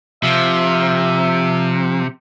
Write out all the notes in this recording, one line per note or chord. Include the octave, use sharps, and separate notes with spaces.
C3 F3 E5